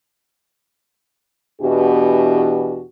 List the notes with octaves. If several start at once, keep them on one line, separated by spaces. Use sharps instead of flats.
E2 B2 E3 D4 F#4 G4